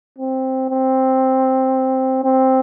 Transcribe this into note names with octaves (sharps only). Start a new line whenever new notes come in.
C4
C4
C4